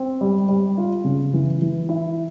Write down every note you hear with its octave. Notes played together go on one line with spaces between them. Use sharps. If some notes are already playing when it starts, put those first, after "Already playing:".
Already playing: C4
G3
G3
F4
C#3
E3
E3
E4